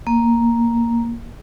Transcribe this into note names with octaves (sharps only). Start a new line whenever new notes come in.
A#3